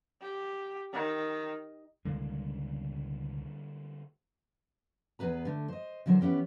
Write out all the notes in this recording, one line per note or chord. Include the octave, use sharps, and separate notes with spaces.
G4
D#3
C#2 B2 D3 G3 G#3 A#3
E2 B3 G#4 B4 A#5
D3 A3
C5 D#5
D3 E3 F#3 A#4 C5
E3 B3 C#4 G4